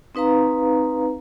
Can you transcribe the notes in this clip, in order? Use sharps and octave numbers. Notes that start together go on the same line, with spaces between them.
C4 D#4 B4 F5 A#5